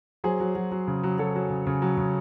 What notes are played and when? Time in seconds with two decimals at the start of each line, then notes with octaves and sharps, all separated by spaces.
0.24 F#3 G#4 C5
0.40 F#3
0.55 F#3
0.72 F#3
0.87 C#3
1.03 F#3
1.18 F#3 A4 C#5
1.35 F#3
1.50 C#3
1.67 C#3
1.82 F#3
1.97 C#3